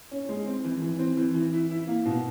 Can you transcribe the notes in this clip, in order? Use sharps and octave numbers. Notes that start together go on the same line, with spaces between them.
C#4
G#3
C4
E3
E3
C4
E3
E3
E4
E4
A#3
B2